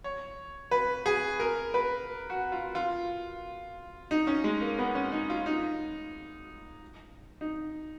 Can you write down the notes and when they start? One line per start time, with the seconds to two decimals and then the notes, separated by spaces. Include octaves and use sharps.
0.04 C#5
0.71 B4
1.06 G#4
1.40 A#4
1.74 B4
2.30 F#4
2.52 F4
2.75 F4
4.11 D#4
4.27 C#4
4.44 G#3
4.61 A#3
4.79 B3
4.95 C#4
5.12 D#4
5.30 F4
5.46 D#4
7.41 D#4